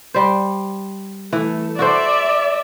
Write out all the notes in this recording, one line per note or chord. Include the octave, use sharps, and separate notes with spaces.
G3 C5
E3 A3
F#4 A4 C5 D5 E5